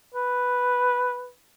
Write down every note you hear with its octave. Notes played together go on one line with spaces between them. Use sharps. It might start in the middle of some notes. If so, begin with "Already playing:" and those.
B4